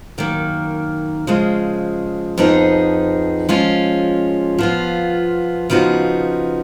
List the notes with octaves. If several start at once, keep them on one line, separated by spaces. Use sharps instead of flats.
F#2 D#3 A#3
C#3 F3 G#3
F2 F3 B3 D#4 G#4
F3 G#3 C#4 F4
F3 B3 F4
C#3 F3 B3 D#4 F#4